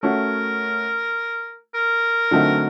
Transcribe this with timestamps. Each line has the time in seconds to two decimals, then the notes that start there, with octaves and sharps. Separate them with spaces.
0.03 A3 C#4 F#4 A#4
1.75 A#4
2.31 D3 F#3 A3 C4 D#4